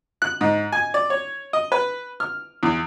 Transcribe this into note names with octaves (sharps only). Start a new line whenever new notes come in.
F#6
G#2
G#5
D5
C#5
D#5
B4
F6
E2